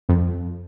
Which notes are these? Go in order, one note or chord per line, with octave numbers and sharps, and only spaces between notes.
F2